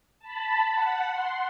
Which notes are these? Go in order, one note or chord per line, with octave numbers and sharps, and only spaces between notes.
A5 B5
F#5
C6